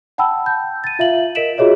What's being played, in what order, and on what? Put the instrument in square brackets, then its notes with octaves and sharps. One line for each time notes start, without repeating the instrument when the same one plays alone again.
[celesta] F#5 G5 A5 B5 E6
A5 G6
A6 D#7
F4 E5 F5 F#7
A#4 D#5 B6 D7 E7 F#7
F4 F#4 G#4 C#5 D#5 E5